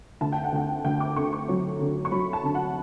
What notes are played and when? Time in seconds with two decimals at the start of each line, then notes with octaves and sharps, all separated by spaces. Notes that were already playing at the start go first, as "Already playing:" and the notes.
0.21 D2 A5
0.32 G5
0.43 F#5
0.52 D2 G5
0.84 D2 G5
1.00 D6
1.16 D3 C#6
1.33 C#6
1.49 F#3
1.80 D3
2.05 C#6
2.12 F#3 B5
2.33 A5
2.43 D3
2.55 F#5